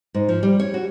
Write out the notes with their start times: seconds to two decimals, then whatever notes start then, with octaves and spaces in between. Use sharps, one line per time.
0.14 G#2
0.29 F3
0.43 G3
0.60 C#5
0.74 F#4